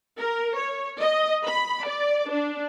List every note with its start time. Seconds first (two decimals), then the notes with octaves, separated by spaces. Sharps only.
0.19 A#4
0.57 C#5
1.01 D#5
1.47 B5
1.87 D5
2.32 D4